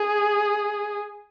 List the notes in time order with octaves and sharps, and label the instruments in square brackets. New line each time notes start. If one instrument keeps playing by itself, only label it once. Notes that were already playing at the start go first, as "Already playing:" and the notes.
Already playing: [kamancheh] G#4